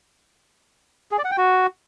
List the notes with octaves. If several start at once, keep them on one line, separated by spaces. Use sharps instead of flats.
G#4
D5
F#5
G5
F#4